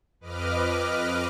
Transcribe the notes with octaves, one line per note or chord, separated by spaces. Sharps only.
F2 B4 D#5 D6 F6